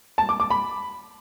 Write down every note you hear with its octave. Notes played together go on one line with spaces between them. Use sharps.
A5
D6
D6
B5